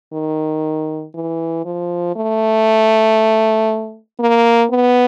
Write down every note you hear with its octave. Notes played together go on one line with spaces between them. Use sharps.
D#3
E3
F3
A3
A#3
B3